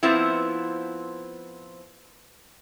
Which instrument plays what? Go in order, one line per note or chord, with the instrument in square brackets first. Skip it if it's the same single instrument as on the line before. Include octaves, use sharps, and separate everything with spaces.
[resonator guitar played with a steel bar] F3 B3 C4 E4